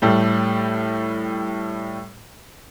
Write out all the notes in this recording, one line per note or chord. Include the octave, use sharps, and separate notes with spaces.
A2 G3 A3